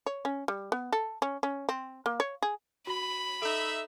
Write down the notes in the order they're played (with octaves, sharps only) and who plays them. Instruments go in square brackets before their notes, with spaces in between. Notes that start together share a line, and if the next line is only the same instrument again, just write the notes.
[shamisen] C#5
C#4
G3
B3
A4
C#4
C#4
C4
A#3
C#5
G#4
[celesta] F#4 [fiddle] B5
[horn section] D#4 E5 [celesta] A4